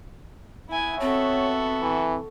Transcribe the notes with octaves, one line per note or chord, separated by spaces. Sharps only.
B3 E4 E5 G#5
C4 F#4 A4 C#5
E3